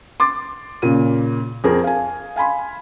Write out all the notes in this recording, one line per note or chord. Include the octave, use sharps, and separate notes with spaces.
C6 D6 A6
A#2 C#3 D#7
F2 G#4 A#4
F5 G#5
F5 G#5 B5 C6